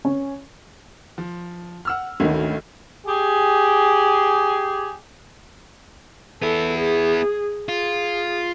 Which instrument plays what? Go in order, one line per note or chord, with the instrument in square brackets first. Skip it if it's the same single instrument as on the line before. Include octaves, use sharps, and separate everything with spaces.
[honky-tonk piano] C#4
[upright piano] F3
F#5 E6 F6
[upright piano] G#1 C#4 [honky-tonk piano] D2 D#3
[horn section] G4 G#4
[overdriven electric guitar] B3 E4 [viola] A4
[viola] G#4
[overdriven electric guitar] F4 [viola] G#4